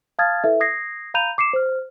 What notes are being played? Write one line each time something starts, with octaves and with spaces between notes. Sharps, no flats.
F5 A5 D#6 F6 G#6 A6
E4 A4 B4 E5
D#6 G#6 A#6 C7
F5 A#5 B5 G6 D#7 F7
D6 C7 C#7 E7
C5 F6